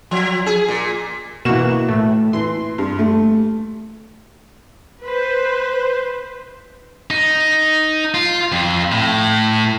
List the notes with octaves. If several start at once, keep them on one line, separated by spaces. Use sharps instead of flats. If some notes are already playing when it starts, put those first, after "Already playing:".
F3
G#4
A#2
B2 E3 A#3 F#4 E7
A2 A3
E3 C6
G2
A3
B4 C5
D#4
F4
F2
A2